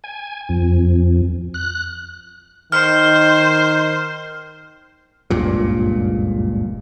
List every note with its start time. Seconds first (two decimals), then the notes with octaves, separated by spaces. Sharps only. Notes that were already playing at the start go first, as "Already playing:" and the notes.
0.04 G#5
0.49 F2
1.54 F#6
2.72 D#3 C5 F6
5.30 F#1 C#2 G2 A#2